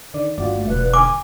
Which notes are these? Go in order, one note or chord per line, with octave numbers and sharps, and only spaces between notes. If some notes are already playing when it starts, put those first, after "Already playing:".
D3 D#3 D5
G1 F4 F#4 D5
A3
E1 B4
D3 G#5 D6